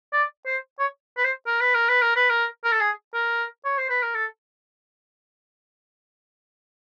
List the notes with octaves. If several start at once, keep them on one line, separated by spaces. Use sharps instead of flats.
D5
C5
C#5
B4
C5
A#4
B4
A#4
B4
A#4
B4
A#4
A#4
A4
G#4
A#4
C#5
C5
B4
A#4
A4